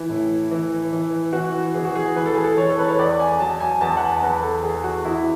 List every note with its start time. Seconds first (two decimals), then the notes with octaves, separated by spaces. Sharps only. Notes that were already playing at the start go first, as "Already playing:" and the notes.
Already playing: E3 E4
0.09 A2
0.51 E3
0.93 E3
1.33 E3 F#4
1.74 E3 G#4
1.85 F#4
1.95 G#4
2.16 E3 B4
2.26 A4
2.35 G#4
2.44 A4
2.57 E3 C#5
2.69 A4
2.79 B4
2.88 C#5
2.99 E2 D5
3.20 G#5
3.40 F#3 A5
3.60 G#5
3.81 E2 A5
3.97 F#5
4.02 G#5
4.22 E2 B4
4.43 A4
4.63 E2 G#4
4.84 F#4
5.05 E2 E4